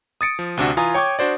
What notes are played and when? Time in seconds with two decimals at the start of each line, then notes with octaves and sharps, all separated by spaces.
0.21 D#6 A6 C#7 D7
0.39 F3
0.57 D2 C3 D4 F#4
0.77 E3 F4 G#5 A#5 D#6
0.94 C#5 G5 C#6 D6 G#6
1.19 D4 F#4 C5 D5